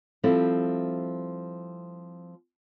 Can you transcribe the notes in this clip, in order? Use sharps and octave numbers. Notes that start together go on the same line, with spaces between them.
F3 G3 C4 E4 A4